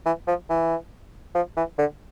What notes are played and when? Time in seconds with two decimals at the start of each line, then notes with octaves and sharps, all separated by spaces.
0.06 E3
0.28 F3
0.50 E3
1.35 F3
1.57 E3
1.79 D3